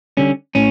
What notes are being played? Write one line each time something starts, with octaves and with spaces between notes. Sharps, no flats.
D3 G3 C#4
A2 C#4